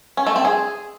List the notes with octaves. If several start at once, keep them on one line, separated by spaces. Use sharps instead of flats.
C#4
A3
C4
G#4